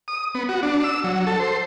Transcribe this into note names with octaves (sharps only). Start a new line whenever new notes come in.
D#6
B3
F#4
D4
E6
F#3
A4
C5